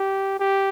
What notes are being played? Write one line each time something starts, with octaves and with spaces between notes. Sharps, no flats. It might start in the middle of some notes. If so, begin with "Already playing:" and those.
Already playing: G4
G4